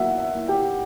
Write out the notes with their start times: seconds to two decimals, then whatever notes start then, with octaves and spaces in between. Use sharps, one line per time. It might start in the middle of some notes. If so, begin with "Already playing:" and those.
Already playing: F#3 A#3 E4 E5 F#5
0.18 E5
0.34 A#3 E4
0.48 G4 G5